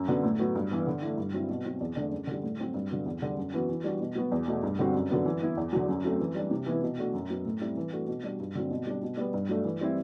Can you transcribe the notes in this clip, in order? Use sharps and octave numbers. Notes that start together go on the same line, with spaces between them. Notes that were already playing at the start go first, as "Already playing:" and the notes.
Already playing: F#2
D3 F#3 B3
A2
F#3 B3 F#4
G2
E3 B3
D3
A3 E4
G2
F#3 C4 E4
B2
F#3 C4
E2
D3 A3 D4
F#2
D3 G3
A2
F#3 C4 F#4
G2
D3 F#3 B3
E2
D3 G3
F#2
E3 B3 F#4
E3
G3 D4 F#4
B2
F#3 B3 F#4
E2
B2 A3
G2
D3 G3 C4 F#4
F#2
D3 F#3 B3
E3
B3 E4
E2
D3 F#3
F#2
F#3 A3 C4
E3
G3 D4
C3
E3 B3 E4
B2
A3 D4 F#4
F#2
F#3 B3
A2
G3 C4 E4
E3
A3 D4 F#4
B2
G3 D4 F#4
G2
D3 F#3 C4
B2
G3 D4
B2
G3 B3
G2
F#3 A3 D4
E3
G3 C4 E4